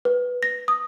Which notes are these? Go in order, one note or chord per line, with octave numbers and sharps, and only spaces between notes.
B4
A#6
D#6